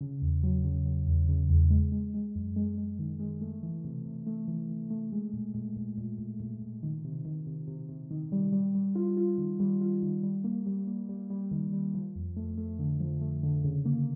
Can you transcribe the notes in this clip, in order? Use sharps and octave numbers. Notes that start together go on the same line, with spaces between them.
C#3
E2
F#3
C#3
F#3
E2
C#3
E2
G#3
G#3
G#3
F#2
G#3
G#3
D#3
G#3
A3
E3
C3
C3
A3
E3
E3
A3
G#3
A#2
A#2
A#2
A#2
A#2
A#2
A#2
D#3
C3
D#3
C3
C3
C3
D#3
G3
G3
G3
F4
F4
D#3
G3
F4
D#3
G3
A#3
G3
A#3
G3
G3
D#3
G3
F3
F2
A3
A3
D3
F3
A3
D3
C#3
A#3